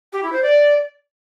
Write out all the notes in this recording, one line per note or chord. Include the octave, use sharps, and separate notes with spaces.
G4
E4
C5
D5